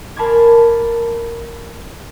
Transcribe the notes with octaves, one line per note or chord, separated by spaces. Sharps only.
A#4 A5 B5 C6 D6 G#6